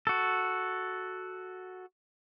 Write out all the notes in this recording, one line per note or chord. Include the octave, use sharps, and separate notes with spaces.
F#4 A4